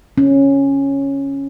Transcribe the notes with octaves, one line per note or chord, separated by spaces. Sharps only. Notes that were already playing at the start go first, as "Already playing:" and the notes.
C#4